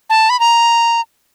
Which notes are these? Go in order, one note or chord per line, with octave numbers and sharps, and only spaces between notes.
A5
B5
A#5